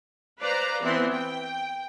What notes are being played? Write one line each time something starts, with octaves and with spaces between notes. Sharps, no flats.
B4 C5 D5 F5 A#5
E3 B3 C4 E4 C6
G5